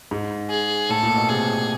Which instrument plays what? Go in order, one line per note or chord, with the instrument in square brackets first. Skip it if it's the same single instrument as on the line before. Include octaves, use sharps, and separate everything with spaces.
[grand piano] G#2
[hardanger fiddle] G#4
[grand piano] A2 [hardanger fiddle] A4
[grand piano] A#2
B2
[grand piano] C3 [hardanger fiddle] G#4